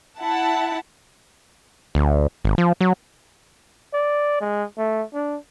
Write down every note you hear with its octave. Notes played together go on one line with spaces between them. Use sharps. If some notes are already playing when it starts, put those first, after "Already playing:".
E4 F#5 A5
D2
G#1
F3
F#3
D5
G#3
A3
D4